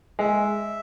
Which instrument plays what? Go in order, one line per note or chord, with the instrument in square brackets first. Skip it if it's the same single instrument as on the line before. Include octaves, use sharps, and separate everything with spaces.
[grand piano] G#3 [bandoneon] E5